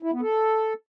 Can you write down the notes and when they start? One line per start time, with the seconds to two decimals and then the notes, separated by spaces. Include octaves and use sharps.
0.03 E4
0.12 B3
0.21 A4